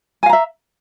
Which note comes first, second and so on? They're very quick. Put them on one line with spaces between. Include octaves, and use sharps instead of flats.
G#5 F5 A#5 E5